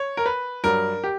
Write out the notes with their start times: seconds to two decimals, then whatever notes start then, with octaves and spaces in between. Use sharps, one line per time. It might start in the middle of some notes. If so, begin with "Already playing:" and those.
Already playing: C#5
0.17 A#4
0.26 B4
0.64 G2 F#3 A#4
1.04 G4